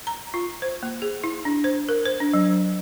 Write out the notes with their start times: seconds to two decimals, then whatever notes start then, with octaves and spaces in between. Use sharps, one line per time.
0.07 A#5
0.34 F4
0.62 C5
0.83 A#3
1.02 G#4
1.24 E4
1.45 D4
1.64 C5
1.89 A#4
2.05 C5
2.20 D4
2.34 F#3